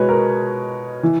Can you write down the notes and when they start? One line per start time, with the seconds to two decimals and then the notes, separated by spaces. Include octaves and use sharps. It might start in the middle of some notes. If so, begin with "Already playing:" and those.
Already playing: B2 G#3 B4 C#5
0.09 A#4
1.03 E3